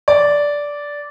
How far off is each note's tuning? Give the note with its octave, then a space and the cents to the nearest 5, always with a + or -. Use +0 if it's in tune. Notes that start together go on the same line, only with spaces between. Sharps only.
D5 -10